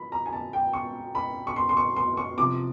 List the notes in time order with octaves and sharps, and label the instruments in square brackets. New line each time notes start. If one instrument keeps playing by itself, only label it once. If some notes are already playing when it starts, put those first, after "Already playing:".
Already playing: [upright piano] F3 B5
A#5
G#5
A5
G5
C#6
B5
C#6
C6
C6
C#6
C6
C#6
C3 F3 D6